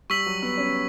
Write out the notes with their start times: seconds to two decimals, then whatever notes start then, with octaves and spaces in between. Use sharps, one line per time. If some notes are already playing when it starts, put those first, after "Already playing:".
0.10 G3 C#6 E6 B6 F#7
0.26 F#3
0.42 B3
0.58 C#4